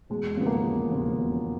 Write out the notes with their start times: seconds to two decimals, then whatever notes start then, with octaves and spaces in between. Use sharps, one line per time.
0.10 E1 G#3
0.37 D#2 C#3 F3 B3
0.47 A#3
0.65 E1
0.91 D#2 C#3 F3
1.19 E1